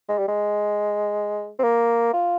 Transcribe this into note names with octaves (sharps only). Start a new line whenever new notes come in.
G#3
G3
G#3
C4
A#3
F4